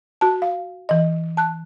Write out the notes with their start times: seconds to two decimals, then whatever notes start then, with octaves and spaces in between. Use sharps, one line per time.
0.21 F#4 A5
0.42 F5
0.89 E3 D#5
1.37 A5 F#6